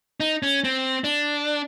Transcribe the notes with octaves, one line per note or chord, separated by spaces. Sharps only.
D#4
C#4
C4
D4